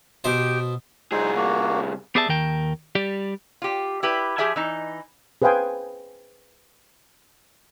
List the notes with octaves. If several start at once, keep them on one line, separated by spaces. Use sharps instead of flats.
B2 G4 C5
C2 D#4 G#4 C5
A#3 F#4
B3 G4 G#4 D5 E5 A5
D#2 D#3 A#4 G5 A5
G3 G4 D5
F4 G4
E4 G4 B4
F3 G4 G#4 E5 G#5
E3 D#4
G#4 B4 C5 F5 G5 G#5